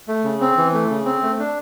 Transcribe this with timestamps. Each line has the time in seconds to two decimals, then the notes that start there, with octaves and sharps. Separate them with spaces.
0.08 A3
0.24 C#3
0.41 C4
0.57 E3
0.73 A3
0.89 C#3
1.05 C4
1.22 A3
1.39 D4